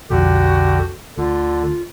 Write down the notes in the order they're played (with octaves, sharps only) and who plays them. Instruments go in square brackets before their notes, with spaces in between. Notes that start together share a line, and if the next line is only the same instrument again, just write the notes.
[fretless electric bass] B1 F2 F3 [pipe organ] D3 G4 [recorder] F#4
[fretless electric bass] D2 [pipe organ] D3 [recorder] F4